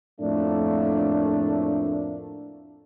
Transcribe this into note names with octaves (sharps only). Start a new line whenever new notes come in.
F2 A2 A3 A#3 D4